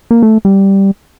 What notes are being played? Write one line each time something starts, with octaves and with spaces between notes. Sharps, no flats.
A#3
A3
G3